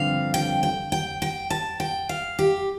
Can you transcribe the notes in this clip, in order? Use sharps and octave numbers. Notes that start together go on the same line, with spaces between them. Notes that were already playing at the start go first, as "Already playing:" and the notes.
Already playing: G2 D3 F3 C4 F5
G5
G5
G5
G5
A5
G5
F5
G4